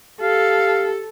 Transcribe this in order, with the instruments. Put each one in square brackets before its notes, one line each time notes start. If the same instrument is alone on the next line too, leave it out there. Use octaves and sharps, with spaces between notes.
[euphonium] G4 [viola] A4 [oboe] F5